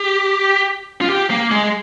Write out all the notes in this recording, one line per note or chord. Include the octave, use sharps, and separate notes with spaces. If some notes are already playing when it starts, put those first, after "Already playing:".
Already playing: G4
F4
G4
A#3
G#3